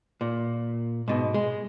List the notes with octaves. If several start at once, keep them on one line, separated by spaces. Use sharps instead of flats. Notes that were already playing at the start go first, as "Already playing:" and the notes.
A#2
G#2 B2
G#3